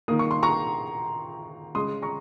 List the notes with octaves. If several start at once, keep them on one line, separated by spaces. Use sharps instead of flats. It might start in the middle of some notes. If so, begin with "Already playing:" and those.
D#3 A#3 D#6
C#6
C6
A#5 C#6
C#3 G#3 C6 D#6
A#5 C#6